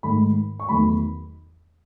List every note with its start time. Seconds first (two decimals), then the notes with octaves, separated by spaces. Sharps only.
0.03 G#2 D#3 A3 B5
0.60 C#6
0.69 E2 D#3 F#3 A3 B5